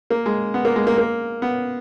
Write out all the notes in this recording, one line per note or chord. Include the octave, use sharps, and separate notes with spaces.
A#3
G#3
B3
A#3
G#3
A#3
A#3
B3